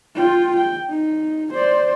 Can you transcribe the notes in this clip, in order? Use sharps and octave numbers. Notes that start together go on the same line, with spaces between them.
F4 G5
G5
D#4
C5 D5